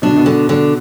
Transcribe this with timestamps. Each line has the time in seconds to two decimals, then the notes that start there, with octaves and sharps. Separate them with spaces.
0.02 B2 D4
0.10 D3
0.16 B2
0.26 D3
0.49 D3